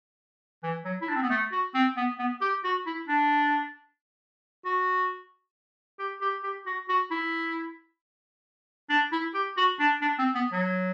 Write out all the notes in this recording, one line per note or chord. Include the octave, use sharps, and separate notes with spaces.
E3
F#3
E4
D4
C4
B3
A3
F#4
C4
B3
B3
G4
F#4
E4
D4
F#4
G4
G4
G4
F#4
F#4
E4
D4
E4
G4
F#4
D4
D4
C4
B3
F#3